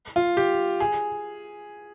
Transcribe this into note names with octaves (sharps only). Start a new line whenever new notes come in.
F4
G4
G#4